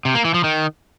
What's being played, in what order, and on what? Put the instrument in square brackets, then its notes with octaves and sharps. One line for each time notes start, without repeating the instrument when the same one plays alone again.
[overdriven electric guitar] C3
A#3
E3
F3
D#3